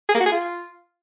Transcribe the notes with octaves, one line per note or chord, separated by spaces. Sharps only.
G#4
A#3
F#4
G#4
F4